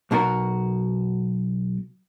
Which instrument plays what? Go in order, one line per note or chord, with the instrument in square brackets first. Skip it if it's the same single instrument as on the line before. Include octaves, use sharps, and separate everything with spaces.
[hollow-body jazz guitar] B1 B2 F#4 A#4